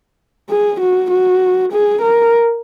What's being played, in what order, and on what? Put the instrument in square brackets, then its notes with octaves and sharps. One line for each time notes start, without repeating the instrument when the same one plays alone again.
[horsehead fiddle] G#4
F#4
F#4
G#4
A#4